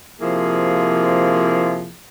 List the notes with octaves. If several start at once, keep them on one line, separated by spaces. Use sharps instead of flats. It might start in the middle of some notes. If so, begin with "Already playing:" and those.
C3 F3 A#3 E4 G#4